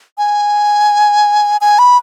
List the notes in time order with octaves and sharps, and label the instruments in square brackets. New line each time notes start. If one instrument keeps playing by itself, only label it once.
[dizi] G#5
G#5
B5